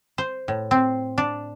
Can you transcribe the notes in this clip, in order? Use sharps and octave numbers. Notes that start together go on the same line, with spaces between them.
C5
A2
C4
D4